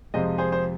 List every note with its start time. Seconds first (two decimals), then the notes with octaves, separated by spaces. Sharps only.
0.14 F2 C3 F3 G#3 C5 D#5
0.38 G#4 C5
0.52 C5